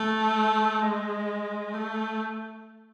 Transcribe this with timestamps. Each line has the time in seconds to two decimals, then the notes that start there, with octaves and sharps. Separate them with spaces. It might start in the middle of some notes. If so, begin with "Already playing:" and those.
Already playing: A3
0.81 G#3
1.74 A3